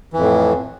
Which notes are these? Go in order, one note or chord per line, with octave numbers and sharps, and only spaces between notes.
F2 A2 E3